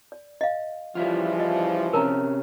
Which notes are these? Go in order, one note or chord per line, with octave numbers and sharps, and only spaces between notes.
D5
D#5 F5
C#3 E3 F3 G3 E4 F4
D#5
C3 C#4 A#4 A5 A#5